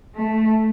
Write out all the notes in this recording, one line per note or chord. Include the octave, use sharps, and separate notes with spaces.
A3